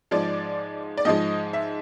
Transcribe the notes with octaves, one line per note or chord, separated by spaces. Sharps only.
G#2 F3 G#3 D5
D5
G#2 F3 G#3 D#5
E5